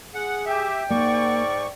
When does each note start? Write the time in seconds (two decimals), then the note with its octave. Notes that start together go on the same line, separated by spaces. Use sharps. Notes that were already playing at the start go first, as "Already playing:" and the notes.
0.15 G#4 F#5
0.46 G4 E5 G5
0.90 G#2 A#3 D5 C#6